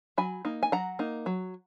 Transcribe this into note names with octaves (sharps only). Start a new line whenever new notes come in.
F#3 G#5 B5
A#3 D#4
G#5
F#3 F#5 A#5
A#3 D#4
F#3